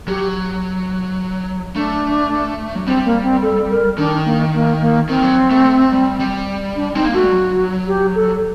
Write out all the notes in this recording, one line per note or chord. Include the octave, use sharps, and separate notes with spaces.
F#3 G4
A3 D4
F#3
G3 C4
A#3
C4
A4
A#4
D#3 D4
A#3
A#3
A#3
D#3 C4
F#3
A3
A3
G3
G3
D4
C4 D#4
A#3
A3 F#4
G3
F#3
G4
A4